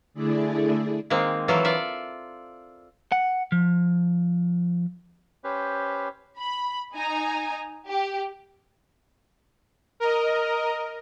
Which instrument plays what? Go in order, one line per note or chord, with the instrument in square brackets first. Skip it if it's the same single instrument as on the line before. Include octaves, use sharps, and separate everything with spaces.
[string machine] D3 A3 E4 G#4 D5
[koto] D#3 G#3 A#3 C4
E3 F#3 F4 A4 A#4 F5
F4 D5 E5
[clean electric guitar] F#5
F3
[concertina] C#4 G4 B4 C5
[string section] B5
D#4 G#5 A#5
G4
[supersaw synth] A#4 D#5